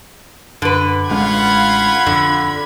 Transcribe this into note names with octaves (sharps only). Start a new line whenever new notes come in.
F#2 D3 B4
A1 G#3 C#4 F4 F5 F#5 B5 G#6
F2 D3